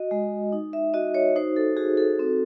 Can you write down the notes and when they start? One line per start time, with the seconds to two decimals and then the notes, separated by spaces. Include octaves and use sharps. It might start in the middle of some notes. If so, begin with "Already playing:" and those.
Already playing: F#4 D#5
0.11 G#3
0.52 D#4
0.73 E5
0.94 F#4 D#5
1.14 C#5
1.36 D#4 C5
1.56 A4
1.77 F#4 G#4
1.97 A4
2.19 C4